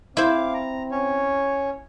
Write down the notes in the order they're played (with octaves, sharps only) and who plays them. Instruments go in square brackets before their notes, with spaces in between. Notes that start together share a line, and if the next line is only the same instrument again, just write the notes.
[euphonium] C4 [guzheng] E4 C5 [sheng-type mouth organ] F5 D6
[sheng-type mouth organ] A#5
C#4 C#5